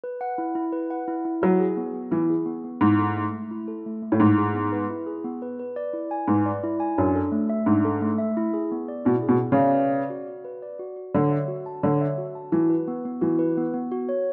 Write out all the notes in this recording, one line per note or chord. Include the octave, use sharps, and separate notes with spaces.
B4
F#5
E4
E4
B4
F#5
E4
E4
F#3 E4
G#4
B3
B3
E3 E4
G#4
B3
B3
G#2 E4
A4
A3
A3
E4
A4
A3
A3
A2
G#2 E4
G#4
B3
B4
E4
G#4
B3
B4
B4
D5
E4
G#5
G#2 B4
D5
E4
G#5
F#2 D4
A4
A3
E5
G#2 D4
A4
A3
E5
E4
G#4
B3
D5
B2 E4
G#4
B2
B3
C#3
D5
B4
D5
F#4
F#4
B4
D5
F#4
F#4
D3 C#5
E5
F#4
A5
D3 C#5
E5
F#4
A5
E3 F#4
B4
B3
B3
E3 F#4
B4
B3
B3
F#4
C#5